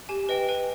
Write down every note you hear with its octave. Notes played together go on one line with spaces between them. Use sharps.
G4 G#5
B4 D#5 G5
B4 G#5